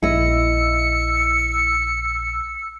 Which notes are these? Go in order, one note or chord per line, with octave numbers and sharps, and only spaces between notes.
A#1 E4 D#5 E6 C#7